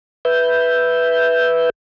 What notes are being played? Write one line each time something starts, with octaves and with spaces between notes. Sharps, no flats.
B4 E5 G6